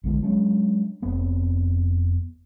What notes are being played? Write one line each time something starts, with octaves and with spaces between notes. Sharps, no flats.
A#1 D3 G#3 B3
F#3 G#3 C#4 D4
F1 B3 C4